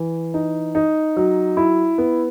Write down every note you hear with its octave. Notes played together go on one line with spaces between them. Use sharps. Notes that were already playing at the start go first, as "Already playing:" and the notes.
Already playing: E3
D#4
D#4
F#3
E4
B3